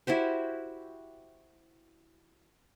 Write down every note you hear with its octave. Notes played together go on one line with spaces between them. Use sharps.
E4 F#4 G4 C5